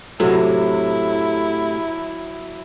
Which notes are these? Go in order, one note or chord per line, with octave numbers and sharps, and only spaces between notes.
A2 C3 F#3 E4 A4